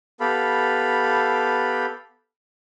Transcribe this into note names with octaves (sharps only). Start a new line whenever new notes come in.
B3 G4 A4 F5 B5